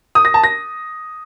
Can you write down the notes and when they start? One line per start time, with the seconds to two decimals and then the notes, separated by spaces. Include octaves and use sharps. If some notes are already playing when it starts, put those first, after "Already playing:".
0.15 D#6
0.25 A#6
0.34 A5
0.44 A#6